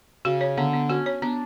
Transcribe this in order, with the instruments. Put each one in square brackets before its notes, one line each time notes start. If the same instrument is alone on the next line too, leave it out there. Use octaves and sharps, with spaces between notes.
[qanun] C#3 [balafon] F#4
[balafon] C#5
[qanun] D3 [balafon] B3
[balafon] B3
[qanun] C#4 [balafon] F#4
[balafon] C#5
[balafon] B3 [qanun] D4